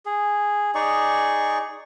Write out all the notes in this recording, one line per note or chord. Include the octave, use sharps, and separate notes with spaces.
G#4
D#4 G#4 D5 C#6